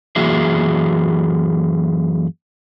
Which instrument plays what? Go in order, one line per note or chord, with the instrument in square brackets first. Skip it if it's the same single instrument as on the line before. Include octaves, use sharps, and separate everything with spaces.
[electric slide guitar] F#2 E3 A#3 F#4 G#4 E5